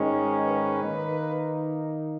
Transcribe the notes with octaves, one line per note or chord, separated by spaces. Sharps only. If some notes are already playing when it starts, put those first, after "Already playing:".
Already playing: G#2 D#3 G#3 C#4
B4
D#3 A#3 D#4